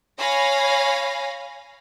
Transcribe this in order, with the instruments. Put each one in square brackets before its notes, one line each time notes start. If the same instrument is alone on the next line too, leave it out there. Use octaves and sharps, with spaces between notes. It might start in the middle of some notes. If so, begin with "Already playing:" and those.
[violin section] C#5 F5 G#5 B5 A#6